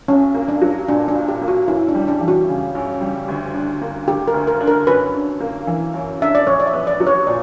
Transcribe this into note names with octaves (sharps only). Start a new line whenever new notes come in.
B1 C#4
A#3
D4
F#3
A#2 D4
D4
B1
G4
A#3
F#4
F#2 E4
D4
G3
D4
E3
F#4
C#3
F#2
G3
D2
D4
A#3
D3 G4
A#4
D2
A#4
D4
A#4
F#2 B4
D4
A#3
E3
F#2
D4 E5
D5
A#1 C#5
D5
E5
B3
D5
F#3
C#5
A#2 D5